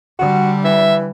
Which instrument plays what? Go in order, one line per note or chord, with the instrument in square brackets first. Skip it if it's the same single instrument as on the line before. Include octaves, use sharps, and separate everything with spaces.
[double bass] D3 G3 [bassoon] F#4
[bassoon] E3 [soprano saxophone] E5